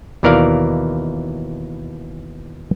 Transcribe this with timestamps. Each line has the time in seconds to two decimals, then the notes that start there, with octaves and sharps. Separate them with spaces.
0.23 D#2 B2 E3 A#4 D5 F5